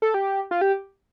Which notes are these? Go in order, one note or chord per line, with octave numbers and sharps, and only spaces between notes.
A4
G4
F4
G4